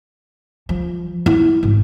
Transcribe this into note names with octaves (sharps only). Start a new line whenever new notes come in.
F3
E4
G#1